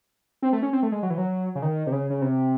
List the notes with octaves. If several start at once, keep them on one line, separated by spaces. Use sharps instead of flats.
C4
A3
C#4
C4
A3
G#3
F#3
E3
F#3
C#3
D#3
C3
C#3
C#3
C3